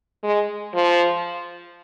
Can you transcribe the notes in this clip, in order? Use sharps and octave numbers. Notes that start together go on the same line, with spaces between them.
G#3
F3